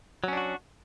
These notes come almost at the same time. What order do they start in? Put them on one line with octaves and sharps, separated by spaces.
F#3 C#4 D4 F#4